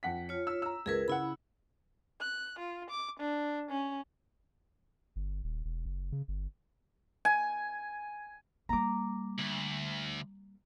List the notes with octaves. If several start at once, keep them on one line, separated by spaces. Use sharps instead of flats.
F2 F#5 B6
F4 C#5
E6
A#5 E6
C#2 G#4 A#4 B4 G#6
C#3 E4 F#5 B5
F#6
F4
D6
D4
C#4
G1
D#1
E1
F#1
C#3
G1
G#5
G3 A#3 A#5 D6
D2